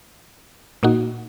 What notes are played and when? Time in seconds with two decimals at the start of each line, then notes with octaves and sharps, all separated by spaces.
0.83 A#2 A#3 D#4 F#4